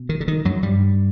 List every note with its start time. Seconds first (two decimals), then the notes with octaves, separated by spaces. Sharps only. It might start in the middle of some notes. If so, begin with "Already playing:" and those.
Already playing: B2
0.09 D#3
0.20 D3
0.28 D#3
0.45 F#2 F#3
0.62 G2 G3